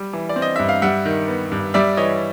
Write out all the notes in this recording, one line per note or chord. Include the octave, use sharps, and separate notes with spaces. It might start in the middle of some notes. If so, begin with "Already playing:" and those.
Already playing: G3
E3
D5
C4
D#5
G2 E5
F5
G3 E5 F#5
D#3
B3
G2
G3 D5 E5
E3 C#5 D#5